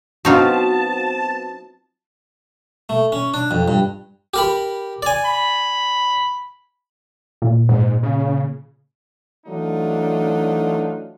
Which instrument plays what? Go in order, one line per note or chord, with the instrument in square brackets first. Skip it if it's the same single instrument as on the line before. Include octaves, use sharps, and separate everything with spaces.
[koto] F#3 D#4 F4 [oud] B3 C4 F#4 [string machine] A5
[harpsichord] A3
C#4
D4
F2
G2
G4 A#4 B5
D5 G#5
[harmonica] B5
[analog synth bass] A#2
[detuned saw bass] G#2
C#3
[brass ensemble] E3 F#3 A3 D4 D#4 F4